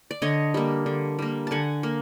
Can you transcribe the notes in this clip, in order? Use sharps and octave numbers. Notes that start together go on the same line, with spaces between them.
D5
D3 C#5 D#5
G3 A#3
D3
G3 A#3
D3 F#5 G#5 A5
A#3